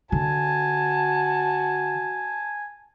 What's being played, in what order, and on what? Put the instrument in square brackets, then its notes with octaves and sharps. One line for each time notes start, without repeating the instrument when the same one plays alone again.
[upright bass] D3 [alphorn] F#4 [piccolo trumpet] G#5 [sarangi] A5